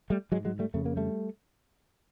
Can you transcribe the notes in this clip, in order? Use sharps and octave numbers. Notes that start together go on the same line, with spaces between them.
G3 A3
G#2 F#3 G#3
F#3 G#3
G3 A3
F2 C#3 A3
A#3
G3 A3